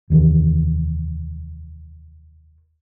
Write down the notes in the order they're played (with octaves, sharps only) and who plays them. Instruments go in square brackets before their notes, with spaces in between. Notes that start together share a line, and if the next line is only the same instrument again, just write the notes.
[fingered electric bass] F1 D#2 D#3 E3